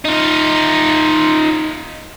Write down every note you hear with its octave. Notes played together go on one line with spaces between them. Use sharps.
D#4 F4